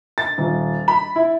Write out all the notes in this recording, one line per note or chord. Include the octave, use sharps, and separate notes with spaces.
A6
D#1
B5
E4